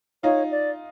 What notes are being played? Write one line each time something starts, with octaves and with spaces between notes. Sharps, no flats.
D#4 F4 C#5
D5